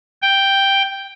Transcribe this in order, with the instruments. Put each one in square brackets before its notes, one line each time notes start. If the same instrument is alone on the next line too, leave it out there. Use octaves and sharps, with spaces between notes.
[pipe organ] G5